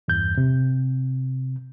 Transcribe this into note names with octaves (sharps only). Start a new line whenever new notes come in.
E2 G2 G6
C3